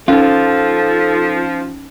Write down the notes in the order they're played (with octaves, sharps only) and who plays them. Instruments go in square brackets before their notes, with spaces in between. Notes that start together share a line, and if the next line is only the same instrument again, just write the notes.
[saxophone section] F3 [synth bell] C#4 D#4 [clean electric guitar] F4 [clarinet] A4